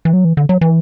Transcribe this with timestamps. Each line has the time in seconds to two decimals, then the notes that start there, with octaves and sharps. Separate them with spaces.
0.05 E3
0.13 F#3
0.25 E3
0.37 D3
0.49 F#3
0.61 E3